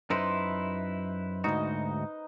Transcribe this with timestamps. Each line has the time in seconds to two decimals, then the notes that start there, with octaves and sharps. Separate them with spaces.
0.10 F#2 D#4 E4 B4 C5 C6
1.44 D2 G#2 D#4 F#4 D#5